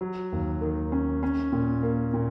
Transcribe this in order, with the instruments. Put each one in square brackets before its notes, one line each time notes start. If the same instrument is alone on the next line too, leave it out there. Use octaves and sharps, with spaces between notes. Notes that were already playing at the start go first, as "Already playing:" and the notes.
[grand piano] F#3
D#2
D#3
C#4
C#4
A#2
A#3
A#2